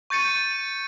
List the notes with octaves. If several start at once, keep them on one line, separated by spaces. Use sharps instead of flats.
C#6 G6 A6 C#7 D#7